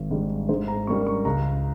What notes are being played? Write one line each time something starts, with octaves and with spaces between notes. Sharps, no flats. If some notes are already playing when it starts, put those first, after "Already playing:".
Already playing: G#1
G#2 G3
G#2 C5
A#5
G3 A#3 C#4 C#6
C#6
C#2 A#5